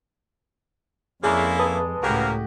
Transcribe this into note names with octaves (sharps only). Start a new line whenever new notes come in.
F2 G#3 A#3 C#4 E4 G#4 D5
B4 D#5 A5 D#6
C#2 A2 C#3 A#3 F#4 G4 A#4 F#5